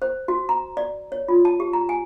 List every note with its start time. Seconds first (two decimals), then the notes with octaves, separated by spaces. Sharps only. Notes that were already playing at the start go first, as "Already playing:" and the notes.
0.02 C5
0.28 F#4
0.49 A#5
0.77 D5
1.12 C#5
1.28 F4
1.45 A5
1.60 G4
1.73 A#5
1.89 G#5